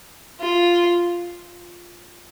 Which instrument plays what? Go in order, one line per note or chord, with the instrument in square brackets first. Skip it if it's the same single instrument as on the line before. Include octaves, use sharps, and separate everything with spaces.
[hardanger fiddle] F4